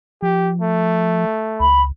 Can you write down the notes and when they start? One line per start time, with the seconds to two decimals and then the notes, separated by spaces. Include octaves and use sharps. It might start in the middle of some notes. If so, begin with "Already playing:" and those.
0.22 F3 G4
0.62 A3
1.60 C#2 B5